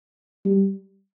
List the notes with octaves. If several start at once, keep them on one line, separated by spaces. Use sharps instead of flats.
G3